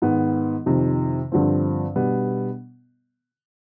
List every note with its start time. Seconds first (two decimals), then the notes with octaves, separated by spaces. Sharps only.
0.02 G#2 D#3 B3
0.66 F2 C3 D#3
1.32 G2 D3 F3 C4
1.96 B2 G3 B3 D4